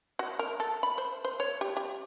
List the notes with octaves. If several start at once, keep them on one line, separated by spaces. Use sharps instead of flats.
F#4
A#4
A4
B5
C5
C5
C#5
G4
G4